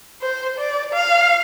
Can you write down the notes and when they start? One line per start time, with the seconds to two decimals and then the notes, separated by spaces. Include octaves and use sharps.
0.22 C5
0.58 D5
0.94 F5